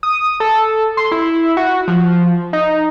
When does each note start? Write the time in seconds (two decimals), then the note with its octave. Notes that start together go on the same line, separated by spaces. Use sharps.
0.03 D#6
0.40 A4
0.97 C6
1.12 E4
1.57 F#4
1.88 F3
2.53 D#4